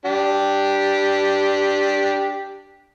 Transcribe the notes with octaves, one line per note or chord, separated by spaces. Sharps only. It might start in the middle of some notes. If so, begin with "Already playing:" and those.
D4 G4